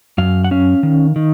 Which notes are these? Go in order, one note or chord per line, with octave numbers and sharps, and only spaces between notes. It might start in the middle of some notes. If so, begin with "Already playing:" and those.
F#2 F5
F#5
C#4 F5
D#3
D#3